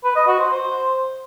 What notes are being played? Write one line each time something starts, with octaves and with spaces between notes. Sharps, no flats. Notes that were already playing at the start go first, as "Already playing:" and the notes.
B4
D#5
F#4
C5
C5